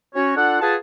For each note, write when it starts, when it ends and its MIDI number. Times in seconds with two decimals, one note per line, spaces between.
0.15 0.32 61
0.15 0.32 66
0.15 0.32 73
0.36 0.59 62
0.36 0.59 65
0.36 0.59 69
0.36 0.59 78
0.61 0.74 65
0.61 0.74 68
0.61 0.74 71
0.61 0.74 78
0.61 0.74 81